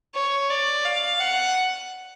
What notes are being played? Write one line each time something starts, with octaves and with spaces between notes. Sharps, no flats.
C#5
D5
F5
F#5